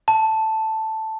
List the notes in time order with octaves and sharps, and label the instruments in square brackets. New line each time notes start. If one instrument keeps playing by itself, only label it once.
[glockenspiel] A5